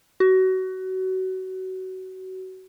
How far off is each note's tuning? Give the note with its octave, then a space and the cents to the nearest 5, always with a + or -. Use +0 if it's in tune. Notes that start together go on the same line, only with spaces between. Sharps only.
F#4 +25